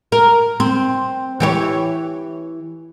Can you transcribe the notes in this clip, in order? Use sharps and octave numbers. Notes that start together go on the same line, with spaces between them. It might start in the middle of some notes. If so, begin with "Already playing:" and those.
A#4
C4
E3 G4 C#5